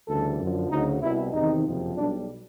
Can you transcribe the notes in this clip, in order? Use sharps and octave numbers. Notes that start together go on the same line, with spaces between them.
D2 C#3 E3 G3 A4
F#2 D3 F3
D2 C#3 F#3 D#4
C2 B2 G3 E4
E2 C3 D#3 D#4
F#1 F2 C3 F3
B1 B2 G3 D4